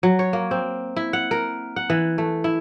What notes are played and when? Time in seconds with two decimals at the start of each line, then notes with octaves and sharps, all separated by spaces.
0.03 F#3
0.19 C#5
0.33 A#3
0.51 C4
0.96 E4
1.13 F#5
1.31 A#4
1.76 F#5
1.90 E3
2.18 A3
2.44 E4